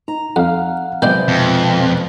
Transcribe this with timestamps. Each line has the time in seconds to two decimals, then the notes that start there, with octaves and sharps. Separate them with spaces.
0.08 D#4 A#5
0.36 F2 F5 F#5
1.02 C3 D#3 F#3 G#3 B3 D4 C5 G6
1.28 F2 B2